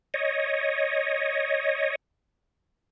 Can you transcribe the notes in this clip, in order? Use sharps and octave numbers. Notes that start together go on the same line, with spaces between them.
C#5 D#5